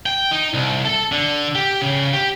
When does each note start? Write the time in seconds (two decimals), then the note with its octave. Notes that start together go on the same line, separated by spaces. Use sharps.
0.06 G5
0.31 D#4
0.54 C2
0.85 A4
1.12 D3
1.55 G4
1.81 C#3
2.14 G4